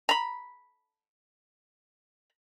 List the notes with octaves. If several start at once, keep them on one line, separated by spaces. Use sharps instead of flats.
A#5 B5